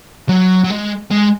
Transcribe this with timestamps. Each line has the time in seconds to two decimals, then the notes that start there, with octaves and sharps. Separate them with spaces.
0.29 F#3
0.64 F#3
0.70 G#3
1.11 G#3